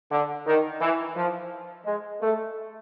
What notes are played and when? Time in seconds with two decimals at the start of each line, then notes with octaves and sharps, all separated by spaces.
0.11 D3
0.47 D#3
0.81 E3
1.16 F3
1.86 G#3
2.22 A3